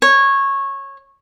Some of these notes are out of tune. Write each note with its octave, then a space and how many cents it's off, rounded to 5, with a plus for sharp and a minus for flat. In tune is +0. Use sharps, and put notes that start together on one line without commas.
C#5 -15